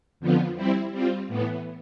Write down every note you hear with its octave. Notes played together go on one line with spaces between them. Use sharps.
F2 D3 F3 B3 F4
G3 C4 E4
G3 C4 F4
A2 E3 B3